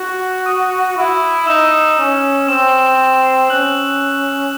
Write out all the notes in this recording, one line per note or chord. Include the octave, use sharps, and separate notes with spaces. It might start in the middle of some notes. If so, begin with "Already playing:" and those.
Already playing: F#4
D#6 D#7
E4
D#4 E6 E7
C#4
C4 E6 E7
C#4 F#6 F#7